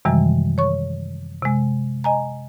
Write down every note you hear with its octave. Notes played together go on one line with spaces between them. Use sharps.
F#2 C3 D#3 E3 G3 G#3
C#5 C#6
C3 G#3
D#5 G#5 A#5